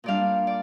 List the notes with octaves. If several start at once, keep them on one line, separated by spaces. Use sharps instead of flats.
A#2 G3 D4 D5 F5
D5